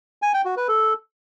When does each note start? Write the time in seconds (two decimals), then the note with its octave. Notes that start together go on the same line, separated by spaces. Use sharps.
0.22 G#5
0.34 G5
0.45 F#4
0.57 B4
0.68 A4